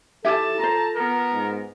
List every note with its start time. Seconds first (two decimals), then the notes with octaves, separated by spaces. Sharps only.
0.25 E4 G4 A4 E5 A5
0.59 F4 C5 A#5
0.96 B3 A#4
1.32 G#2